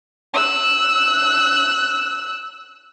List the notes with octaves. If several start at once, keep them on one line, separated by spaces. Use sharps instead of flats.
E6 F#6